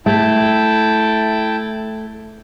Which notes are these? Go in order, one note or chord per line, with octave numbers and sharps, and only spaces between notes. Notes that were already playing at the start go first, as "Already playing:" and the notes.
A3 E4 G5 A5